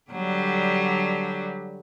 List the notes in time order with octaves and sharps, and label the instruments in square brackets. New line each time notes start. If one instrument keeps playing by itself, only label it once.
[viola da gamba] D3 F#3 G3